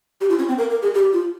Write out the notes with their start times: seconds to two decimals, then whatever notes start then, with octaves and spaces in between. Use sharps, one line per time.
0.21 G4
0.29 F4
0.39 C#4
0.48 C4
0.58 A#4
0.70 A#4
0.82 G#4
0.94 G4
1.13 F4